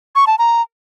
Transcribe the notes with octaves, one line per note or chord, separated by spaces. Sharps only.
C#6
A5
A#5